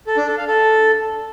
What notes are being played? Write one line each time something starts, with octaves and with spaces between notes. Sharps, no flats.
A4
D4
A4
F5
A4